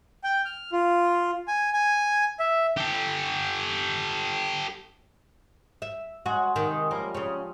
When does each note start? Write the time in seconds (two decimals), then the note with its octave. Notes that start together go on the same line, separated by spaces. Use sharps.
0.24 G5
0.45 F6
0.72 F4
1.48 G#5
1.73 G#5
2.40 E5
2.77 G4 A4
5.82 E5
6.26 G#3 F#4 F#5
6.56 C3 D#3
6.91 F3 G3 A#3
7.15 C#3 C#4